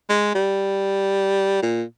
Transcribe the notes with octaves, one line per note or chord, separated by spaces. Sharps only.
G#3
G3
A#2